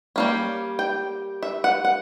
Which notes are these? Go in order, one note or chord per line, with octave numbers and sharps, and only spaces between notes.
G3 A#3 C#4
G5
E5
F#5
F#5